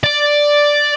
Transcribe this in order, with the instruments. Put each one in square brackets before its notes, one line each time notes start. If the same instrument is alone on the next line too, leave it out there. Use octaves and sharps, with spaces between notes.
[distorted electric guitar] D5